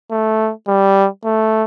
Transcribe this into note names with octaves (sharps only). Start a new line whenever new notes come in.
A3
G3
A3